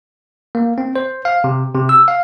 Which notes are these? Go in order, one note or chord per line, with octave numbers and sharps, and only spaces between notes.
A#3
C4
C5
F5
C3
C3
E6
F5